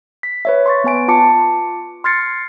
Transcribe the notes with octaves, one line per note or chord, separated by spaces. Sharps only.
B6
B4 C#5 E5
C6 C#6 A6
B3 B4 G#5 D7
F4 A5 D6 C#7
C6 F6 G#6 A6 C7 C#7